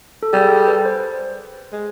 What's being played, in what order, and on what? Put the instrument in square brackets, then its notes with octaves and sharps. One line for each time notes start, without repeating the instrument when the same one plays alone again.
[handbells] A4
[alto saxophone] G3 [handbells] G#4
[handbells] A4
B4
C5
[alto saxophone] G#3